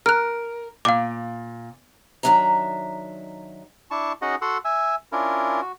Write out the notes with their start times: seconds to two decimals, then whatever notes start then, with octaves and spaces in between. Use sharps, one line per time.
0.06 A#4 F6 F#6
0.85 A#2 F5 D6
2.23 D#3 F#3 D4 E5 A#5
3.91 D4 E4 A5 C#6
4.22 C#4 D#4 F#4 G#4 D#5 F#5
4.42 F#4 A4 F#5 C6 E6
4.65 E5 G#5 E6
5.12 C#4 D4 E4 F4 A#4
5.61 F#4